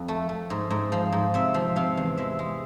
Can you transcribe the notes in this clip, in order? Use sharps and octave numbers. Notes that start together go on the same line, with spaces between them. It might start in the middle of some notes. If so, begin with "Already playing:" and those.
Already playing: F2
A3
A3
G#2
G#2
F3
G#2
C3 E5
F3
C3 F5
E2
G#3 E5
G#3